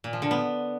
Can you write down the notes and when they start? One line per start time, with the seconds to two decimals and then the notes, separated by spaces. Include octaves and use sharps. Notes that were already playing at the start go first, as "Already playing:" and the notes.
0.04 A#2
0.13 F3
0.22 D3
0.31 B3